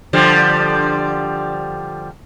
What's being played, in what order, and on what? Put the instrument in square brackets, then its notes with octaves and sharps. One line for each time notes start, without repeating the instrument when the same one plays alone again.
[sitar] D3 F3 G3